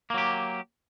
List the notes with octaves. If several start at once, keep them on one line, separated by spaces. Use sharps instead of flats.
F#3 A#3 G4